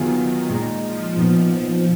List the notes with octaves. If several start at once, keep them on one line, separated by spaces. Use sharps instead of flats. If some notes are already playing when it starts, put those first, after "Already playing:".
Already playing: D#3 F#3 B3 F4 G#4
A#2 G#3 D#4
F3
A#2 F3 B3 D#4